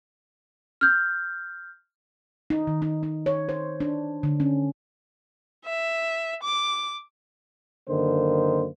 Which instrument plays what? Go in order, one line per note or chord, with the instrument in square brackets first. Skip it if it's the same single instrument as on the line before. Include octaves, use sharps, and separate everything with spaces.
[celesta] F6 G6
[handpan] D#4
D#3
D#4
D#4
C#5
C5
D4
D3
C#4
[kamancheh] E5
D6
[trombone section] F#2 D3 D#3 A#3 C5